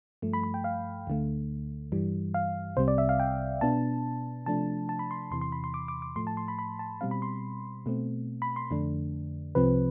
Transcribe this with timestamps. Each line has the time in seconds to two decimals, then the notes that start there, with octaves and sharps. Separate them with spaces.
0.22 G2 F3 A3
0.33 B5
0.43 B5
0.54 G5
0.64 F5
1.07 D2 D3 A3
1.92 G2 E3 G3
2.34 F5
2.77 C2 C3 G3 C4 C5
2.88 D5
2.98 E5
3.09 F5
3.19 G5
3.61 B2 B3 D4 A5
4.46 C3 F3 A3 D4 A5
4.89 A5
4.99 B5
5.11 C6
5.31 E2 C3 E3 C6
5.41 C6
5.52 B5
5.64 C6
5.74 D6
5.88 D6
6.02 D6
6.16 A2 F3 A3 C6
6.27 A5
6.37 C6
6.48 B5
6.59 B5
6.79 A5
7.01 B2 G3 C4 F5
7.11 B5
7.22 C6
7.86 B2 A3 C4
8.42 B5
8.56 C6
8.71 F2 D3 A3 D4
9.55 C2 C3 F3 C4 B4